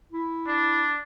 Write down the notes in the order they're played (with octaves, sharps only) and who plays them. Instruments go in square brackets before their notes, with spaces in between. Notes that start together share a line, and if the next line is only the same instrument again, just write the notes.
[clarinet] E4
[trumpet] D4